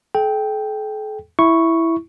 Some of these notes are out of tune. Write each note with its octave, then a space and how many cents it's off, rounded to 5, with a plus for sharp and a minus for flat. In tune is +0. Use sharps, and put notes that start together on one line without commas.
A4 -45 G5 +0
E4 +0 C#6 +0